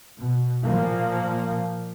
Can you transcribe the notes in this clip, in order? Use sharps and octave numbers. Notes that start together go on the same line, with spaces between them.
B2
A#2 F3 A#3